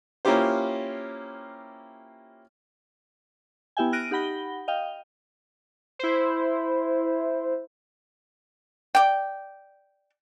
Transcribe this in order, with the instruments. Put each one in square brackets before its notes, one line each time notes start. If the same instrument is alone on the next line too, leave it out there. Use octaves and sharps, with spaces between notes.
[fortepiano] A#3 C#4 E4 F4 G4 C5
[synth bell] B3 E4 G4 E5 G5 G#5
F6 F#6 A#6 D7 D#7
D#4 G4 F#5 B5 A#6 G7
D#5 F5 G5
[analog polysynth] E4 C5
[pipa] D5 G5